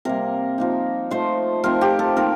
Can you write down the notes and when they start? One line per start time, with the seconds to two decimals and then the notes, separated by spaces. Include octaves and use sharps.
0.05 C3 G3 A#3 A#4
0.58 F3 A#3 D#4
1.11 F3 A3 D#4 C5
1.63 F3 A3 C4 D#4 A#4
1.81 G4
1.99 A4
2.17 D#3 A#3 D#4 A#4